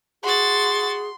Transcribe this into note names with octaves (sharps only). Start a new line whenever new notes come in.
F#4 G#4 C6 A6